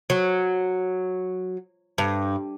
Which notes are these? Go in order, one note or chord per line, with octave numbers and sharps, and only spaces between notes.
F#3
G2